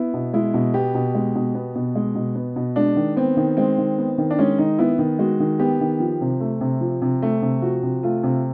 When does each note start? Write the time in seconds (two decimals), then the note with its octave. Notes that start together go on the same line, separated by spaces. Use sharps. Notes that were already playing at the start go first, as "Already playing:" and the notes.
Already playing: B3 E4
0.14 B2
0.33 G#3 E4
0.54 B2
0.74 B3 G4
0.94 B2
1.15 G#3
1.35 B2
1.55 B3
1.75 B2
1.95 G#3
2.15 B2
2.35 B3
2.56 B2
2.76 G#3 D4
2.96 D#3
3.16 B3 C4
3.37 D#3
3.57 G#3 C4
3.78 D#3
3.98 B3
4.18 D#3
4.31 D4
4.39 G#3 C#4
4.59 D#3 D#4
4.78 B3 E4
4.99 D#3
5.19 G#3 F#4
5.40 D#3
5.59 B3 G4
5.81 D#3
6.00 F3
6.21 C3
6.40 A3
6.61 C3
6.81 F3
7.02 C3
7.22 A3
7.42 C3
7.62 F3 F#4
7.83 C3
8.03 A3 F4
8.23 C3